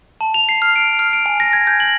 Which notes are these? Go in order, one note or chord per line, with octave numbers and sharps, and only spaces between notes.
A5
F7
C7
F6
D7
F6
D7
G#5
A#6
G#6
G6
F#7